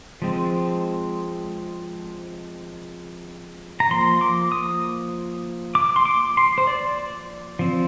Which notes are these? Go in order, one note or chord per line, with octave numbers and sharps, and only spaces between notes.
F3 G#3 C4
A#5
F3 A#3 C6
D6
D#6
D6
C6
D6
C6
C5
D5
F3 C4